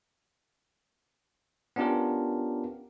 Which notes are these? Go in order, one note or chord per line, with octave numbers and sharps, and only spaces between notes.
B3 C#4 D4 F4 G4 A#4